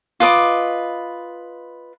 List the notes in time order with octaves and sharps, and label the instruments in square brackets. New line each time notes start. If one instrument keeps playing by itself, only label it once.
[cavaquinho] F4 B4 D#5 D6